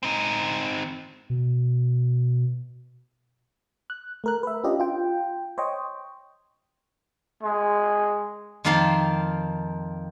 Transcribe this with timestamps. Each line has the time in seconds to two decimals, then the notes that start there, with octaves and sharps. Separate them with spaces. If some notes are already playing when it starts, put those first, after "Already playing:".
0.03 C4 D#4
1.30 B2
3.90 F#6
4.24 A3 A#4 F#6
4.43 B4 E5
4.64 C#4 D4 F4 G4 D#5
4.80 F4 G5
5.58 C5 C#5 D#5 G5
7.43 G#3
8.64 F2 D#3 A#3 F4 C5 F5